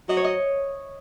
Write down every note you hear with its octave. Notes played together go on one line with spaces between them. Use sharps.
F#3 D#5
C#5
D#5